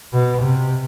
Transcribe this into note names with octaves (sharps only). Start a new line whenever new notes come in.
B2
C3